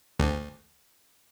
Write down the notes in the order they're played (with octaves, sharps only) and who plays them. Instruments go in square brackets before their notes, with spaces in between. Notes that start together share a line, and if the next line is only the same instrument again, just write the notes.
[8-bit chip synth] D2